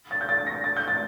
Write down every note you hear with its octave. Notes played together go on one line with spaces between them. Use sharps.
A6
G6
A6
A#6
A6
G6
A6